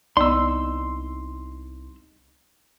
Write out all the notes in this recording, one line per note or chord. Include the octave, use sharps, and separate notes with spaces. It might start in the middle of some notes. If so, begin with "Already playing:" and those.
C2 B3 D#4 D5 C6 E6